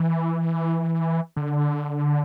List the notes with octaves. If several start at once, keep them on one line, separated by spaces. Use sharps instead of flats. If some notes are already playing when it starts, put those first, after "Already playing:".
Already playing: E3
D3